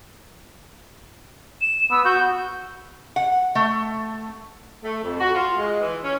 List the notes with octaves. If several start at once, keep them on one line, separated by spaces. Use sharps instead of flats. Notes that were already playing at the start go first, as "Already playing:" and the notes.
E7
B3 E6
F#4 G6
F#5
A3
A3
F2
F#4
F4
G#3
E3
C#4